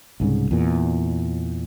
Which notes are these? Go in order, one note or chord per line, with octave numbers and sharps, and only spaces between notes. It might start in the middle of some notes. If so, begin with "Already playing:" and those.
C2 G#2 C#3
E2 A#2